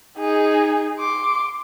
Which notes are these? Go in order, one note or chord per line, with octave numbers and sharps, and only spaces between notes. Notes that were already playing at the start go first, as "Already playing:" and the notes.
D#4 G#4
C6 D6